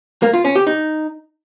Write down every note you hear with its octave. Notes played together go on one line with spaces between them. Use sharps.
A#3
F4
C#4
G4
D#4